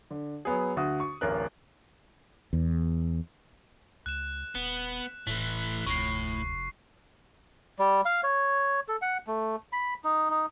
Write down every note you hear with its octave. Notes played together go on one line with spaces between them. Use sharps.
D3
F#3 B3 G#4
D2 F#4 D#6
C#6
D1 A1 A#4 F#6
E2
C#2 F#6 E7
D#1 B3
D#1 A2 E3 A3
F1 D2 A2 C#6 C7
G3
F5
C#5
A4
F#5
A3
B5
D#4
D#4